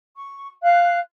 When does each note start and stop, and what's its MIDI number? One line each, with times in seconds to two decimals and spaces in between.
0.17 0.47 85
0.63 0.99 77
0.63 0.99 90